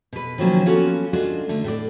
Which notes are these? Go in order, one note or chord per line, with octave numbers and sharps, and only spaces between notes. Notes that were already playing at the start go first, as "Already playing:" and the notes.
B2 B4
D#3 F3 F#3 A#3 C#4
A#3 B3 C#4 F4 F#4 A4
G#3 D4 F4 F#4 A4
D3 A3
A2 A4 D5